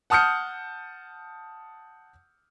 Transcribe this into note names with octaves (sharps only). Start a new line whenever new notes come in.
F#5 A5 D#6 F6 G6 C#7